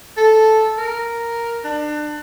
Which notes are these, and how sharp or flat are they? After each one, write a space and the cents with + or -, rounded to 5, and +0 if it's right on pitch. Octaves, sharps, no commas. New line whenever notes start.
A4 -5
A#4 +0
D4 +30